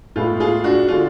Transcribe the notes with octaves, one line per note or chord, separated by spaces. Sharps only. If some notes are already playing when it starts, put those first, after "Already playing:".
A2 G#3 B3 F4
F4 G#4
D4 F#4
D3 G#3 D4 F4